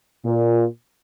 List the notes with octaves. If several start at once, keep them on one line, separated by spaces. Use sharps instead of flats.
A#2